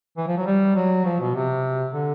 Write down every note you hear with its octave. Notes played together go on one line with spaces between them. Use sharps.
E3
F3
F#3
G3
F#3
F3
B2
C3
D3